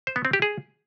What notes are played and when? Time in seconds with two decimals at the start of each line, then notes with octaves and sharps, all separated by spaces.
0.07 C5
0.16 B3
0.25 C4
0.33 G4
0.42 G#4